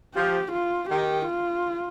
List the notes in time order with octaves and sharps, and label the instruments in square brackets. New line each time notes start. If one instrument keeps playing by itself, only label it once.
[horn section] F3 [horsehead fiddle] G4
[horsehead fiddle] F4
[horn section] D#3 [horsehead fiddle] G4
[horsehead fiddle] F4